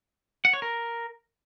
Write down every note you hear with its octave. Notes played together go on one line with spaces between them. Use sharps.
F#5
C#5
A#4